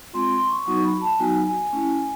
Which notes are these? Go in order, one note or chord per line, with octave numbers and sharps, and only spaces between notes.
G#3 C4 F4 C6
C6
C#6
F#3 B3 D#4 F#4 C#6
B5
A5
F#3 B3 D#4 F#4 G#5
G#5
A3 C#4 E4